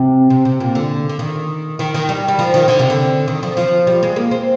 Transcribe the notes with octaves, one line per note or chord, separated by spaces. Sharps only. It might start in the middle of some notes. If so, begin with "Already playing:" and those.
Already playing: C3
C3
C3
A#2
D3
D3
D#3
D#3
D#3
G3
G3
F3
D#3
D3
C3
D3
D#3
F3
F3
G3
G#3
A#3
C4